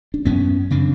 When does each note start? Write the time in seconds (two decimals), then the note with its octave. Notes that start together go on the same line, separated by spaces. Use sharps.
0.14 D4
0.25 F#2 B3 C#4
0.71 C#3 C4 D4